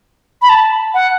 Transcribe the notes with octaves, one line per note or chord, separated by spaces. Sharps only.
B5
A5
F#5